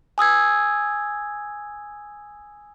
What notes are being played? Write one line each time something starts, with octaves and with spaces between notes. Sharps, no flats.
G#5 D#6 E6 G#6